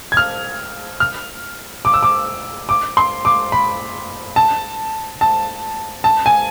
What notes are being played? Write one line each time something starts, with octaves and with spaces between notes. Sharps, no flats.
G#6
F6
F6
D6
E6
D6
D6
C6
D6
B5
A5
A5
A5
G#5